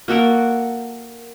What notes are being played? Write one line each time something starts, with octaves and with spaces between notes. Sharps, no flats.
A#3 F#4 A4 A#4